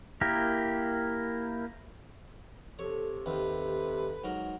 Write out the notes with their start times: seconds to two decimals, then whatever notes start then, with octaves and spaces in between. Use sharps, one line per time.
0.21 A#3 E4 G4 A#4
2.79 C3 A4 C#5
3.26 D#2 C3 A4 B4
4.24 G#2 F#3 A#4